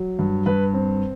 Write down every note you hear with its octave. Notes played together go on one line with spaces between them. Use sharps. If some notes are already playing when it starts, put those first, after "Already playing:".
Already playing: F#3
G2
G2 B4
C4